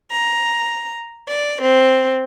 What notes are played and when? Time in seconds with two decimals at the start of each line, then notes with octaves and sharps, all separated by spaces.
0.11 A#5
1.27 D5
1.61 C4